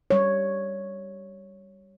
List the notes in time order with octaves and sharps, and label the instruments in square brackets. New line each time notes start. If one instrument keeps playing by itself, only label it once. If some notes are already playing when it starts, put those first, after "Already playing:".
[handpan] G3 C#5